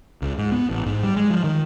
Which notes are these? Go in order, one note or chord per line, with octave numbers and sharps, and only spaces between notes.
C#2
G#2
B3
A1
G#2
G3
G#3
F3
D#3